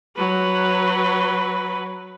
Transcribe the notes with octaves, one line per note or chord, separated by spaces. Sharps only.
F#3 B4